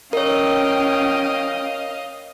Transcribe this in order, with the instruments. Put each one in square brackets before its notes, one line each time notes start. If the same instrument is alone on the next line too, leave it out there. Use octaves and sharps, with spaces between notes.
[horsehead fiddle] C#4 G5 [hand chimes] A#4 C#5 [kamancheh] D#5 F5